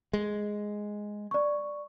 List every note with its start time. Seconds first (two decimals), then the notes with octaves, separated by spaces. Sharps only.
0.13 G#3
1.31 D5 C#6